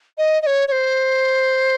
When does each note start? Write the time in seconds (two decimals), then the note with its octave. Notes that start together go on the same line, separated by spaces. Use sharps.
0.18 D#5
0.42 D#5
0.47 C#5
0.68 C#5
0.72 C5